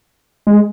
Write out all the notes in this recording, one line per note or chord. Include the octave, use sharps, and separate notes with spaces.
G#3